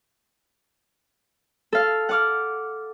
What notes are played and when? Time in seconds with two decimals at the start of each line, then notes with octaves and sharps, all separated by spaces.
1.72 A4 F5
2.09 F#5 D6 F6